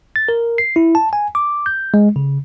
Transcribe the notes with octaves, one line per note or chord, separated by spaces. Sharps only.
A6
A#4
C7
E4
A5
G#5
D6
G6
G#3
C#3